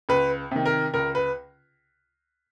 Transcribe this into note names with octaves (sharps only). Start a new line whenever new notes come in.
C#2 B4
C3 D#3
A#4
C#2 A#4
B4